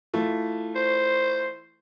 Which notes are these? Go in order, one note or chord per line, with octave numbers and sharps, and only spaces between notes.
E3 A3 F4
C5